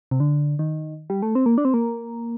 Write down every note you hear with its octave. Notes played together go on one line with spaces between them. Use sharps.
C3
D3
D#3
G3
A3
C4
A#3
D4
C4
A#3